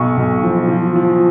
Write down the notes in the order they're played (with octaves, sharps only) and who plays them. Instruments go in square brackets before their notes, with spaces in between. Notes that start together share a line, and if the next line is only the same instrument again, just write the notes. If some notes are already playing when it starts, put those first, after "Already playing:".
Already playing: [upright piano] B1 C#6
B1
F3
F3
F3